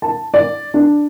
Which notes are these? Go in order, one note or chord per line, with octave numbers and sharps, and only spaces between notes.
A5
D5
D4